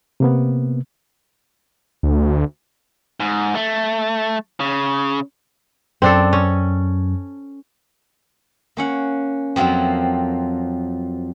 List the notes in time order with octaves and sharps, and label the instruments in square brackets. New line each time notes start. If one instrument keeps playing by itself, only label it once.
[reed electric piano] C3 A#3 B3
[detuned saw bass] D2
[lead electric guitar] G#2
A3
C#3
[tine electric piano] F#2 [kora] C4 D4 A4
[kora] C#4
[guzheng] A#3 C#4 F#5
F2 F3 F#3 A#3 C4